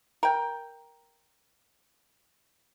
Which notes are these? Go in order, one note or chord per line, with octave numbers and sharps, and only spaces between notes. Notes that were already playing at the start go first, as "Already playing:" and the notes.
A#4 G5